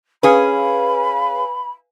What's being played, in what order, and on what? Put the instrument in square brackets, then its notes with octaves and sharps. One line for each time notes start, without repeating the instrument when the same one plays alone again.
[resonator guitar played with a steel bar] C#4 G#4 [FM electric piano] B4 F5 G#5 [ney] B5